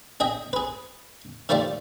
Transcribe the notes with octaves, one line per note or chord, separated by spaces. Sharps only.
G#4 D#5 E5 G5
G#4 B4
D#3 F3 A3 F4 G4 D5